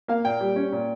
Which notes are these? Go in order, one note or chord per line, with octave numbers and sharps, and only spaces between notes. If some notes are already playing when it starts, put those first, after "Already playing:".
A#3 F5
A#2 G5
G3
C#4
A#2